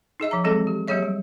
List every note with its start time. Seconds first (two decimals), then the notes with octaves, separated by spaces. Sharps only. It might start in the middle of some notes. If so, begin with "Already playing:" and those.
0.20 D#4 G#4 D#5 E5
0.31 F3 A#5
0.44 E3 F#3 G#3 C4 G#4 A4
0.67 G4
0.88 F#3 A#3 G4 G#4 C#5 E5
1.02 G3